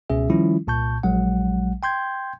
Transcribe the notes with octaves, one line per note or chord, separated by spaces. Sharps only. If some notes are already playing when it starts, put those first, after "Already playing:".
C#2 B2 C#4 G#4 E5
D#3 F3 G3 C#4 E4 F4
C2 A#2 A5 C#6 G6
A#1 F#3 G#3 F#5
G5 C6 G6 G#6